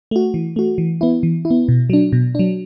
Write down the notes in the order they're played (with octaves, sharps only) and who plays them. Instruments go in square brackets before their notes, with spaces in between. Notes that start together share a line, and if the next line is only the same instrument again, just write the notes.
[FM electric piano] A3 F#4
E3
A3 F#4
E3
B3 E4
E3
E4
B3
B2
F#3 D4
B2
F#3 D4